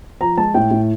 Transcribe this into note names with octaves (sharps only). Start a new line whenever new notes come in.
F3 A#5
G#3 A5
A2 G5
A2